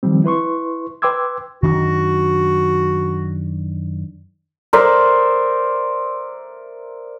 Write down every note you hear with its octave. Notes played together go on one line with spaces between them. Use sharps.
D#3 F3 G3 C4
E4 B4 C6 C#6
B4 G5 C6 D6 E6 G#6
F#2 D#3 D4 F#4
A#4 C5 D5 E5